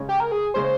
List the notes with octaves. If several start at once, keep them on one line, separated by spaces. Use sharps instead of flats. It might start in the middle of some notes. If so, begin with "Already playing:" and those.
Already playing: C#3 G#3 C#4
G4
A#4
G#4
C#3 G#3 C#4 C5